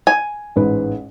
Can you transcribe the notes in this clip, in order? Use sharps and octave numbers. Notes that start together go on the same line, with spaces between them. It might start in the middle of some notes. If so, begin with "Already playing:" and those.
G#5
A1 G#2 B4